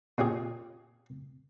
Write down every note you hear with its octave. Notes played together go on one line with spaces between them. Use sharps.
A#2 C#4 G4 G#4